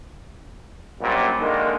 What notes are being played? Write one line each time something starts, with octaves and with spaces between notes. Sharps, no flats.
A#1 F#2 A#2 G3 A#3
D3 D#3 G#3 A#3